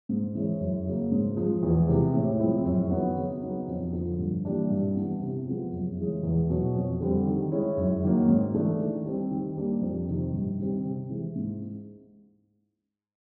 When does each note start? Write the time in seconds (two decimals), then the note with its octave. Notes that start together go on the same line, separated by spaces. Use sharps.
0.09 G#2
0.35 E3 G#3 C#4
0.60 F#2
0.86 C#3 F#3 A#3
1.11 G#2
1.37 F3 G#3
1.63 E2
1.88 C3 E3 G#3
2.14 A2
2.39 F3 G#3 C4 E4
2.65 F#2
2.91 D#3 F#3 B3
3.17 C#3
3.42 F#3 B3 D#4
3.68 F2
3.93 D3 F3
4.19 G2
4.45 E3 G3 A#3 D4
4.71 G2
4.95 E3 G3 B3
5.21 C3
5.47 F3 G#3 B3
5.72 F#2
5.98 C#3 E3 G#3 C#4
6.23 E2
6.50 B2 F#3
6.75 F2
7.01 D3 G3 C4
7.26 D#3
7.52 G#3 C#4 E4
7.77 F#2
8.03 D#3 F#3 A#3
8.28 G#2
8.54 E3 A3 D4
8.80 D#3
9.05 G3 C4
9.31 D#3
9.57 G3 A#3 D4
9.81 F2
10.07 C3 D#3
10.33 G2
10.59 D#3 G3 C4
10.84 C3
11.09 E3 G#3
11.36 G#2